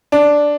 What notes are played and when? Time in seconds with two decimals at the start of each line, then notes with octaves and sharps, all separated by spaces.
0.12 D4